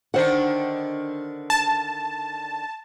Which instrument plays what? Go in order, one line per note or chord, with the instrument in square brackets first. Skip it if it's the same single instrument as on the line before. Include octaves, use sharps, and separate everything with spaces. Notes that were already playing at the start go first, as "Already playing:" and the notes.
[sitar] D3 D#3 D4 [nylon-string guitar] C5 F#5
[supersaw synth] A5